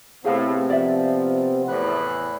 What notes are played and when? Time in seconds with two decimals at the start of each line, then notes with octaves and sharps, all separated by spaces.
0.25 A2 C3 B3 C4 G#4 F5
0.70 F3 D5 E5
1.68 E2 A2 B5 F#6